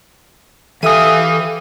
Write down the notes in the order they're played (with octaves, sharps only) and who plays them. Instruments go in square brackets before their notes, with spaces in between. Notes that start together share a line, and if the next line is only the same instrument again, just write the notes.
[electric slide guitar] E3 G#5 [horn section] G4 E5 F5 [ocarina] A4 [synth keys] D#6 D#7